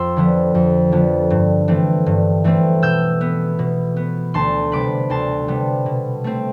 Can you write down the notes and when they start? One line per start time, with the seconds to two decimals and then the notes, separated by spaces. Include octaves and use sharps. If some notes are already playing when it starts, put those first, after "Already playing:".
Already playing: F2 C6 E6
0.16 D3 F3 B3
0.55 F2
0.92 D3 F3 B3
1.30 G2
1.68 E3 A3 C4
2.06 G2
2.44 E3 A3 C4
2.82 B2 E6 G6
3.21 B3
3.59 B2
3.96 B3
4.34 D2 A5 C6
4.72 C3 G3 B3 B5 D6
5.10 D2 A5 C6
5.48 C3 G3 B3
5.86 B2
6.24 A3 C4